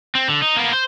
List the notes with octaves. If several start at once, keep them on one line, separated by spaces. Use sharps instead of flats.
C4
D3
D#4
A#3 B3
C5